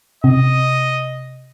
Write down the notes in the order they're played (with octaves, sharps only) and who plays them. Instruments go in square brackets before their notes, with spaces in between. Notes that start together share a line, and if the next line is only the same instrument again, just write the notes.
[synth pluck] C3 [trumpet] D#5